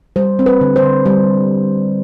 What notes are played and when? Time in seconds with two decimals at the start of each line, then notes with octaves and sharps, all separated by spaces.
0.16 G3 C5
0.39 C4
0.46 B4
0.61 D3
0.76 C5
0.83 D3
1.06 G3